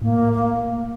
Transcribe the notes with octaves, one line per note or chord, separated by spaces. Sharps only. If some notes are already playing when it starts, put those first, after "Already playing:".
A2 A#3
A#2
A2
A#3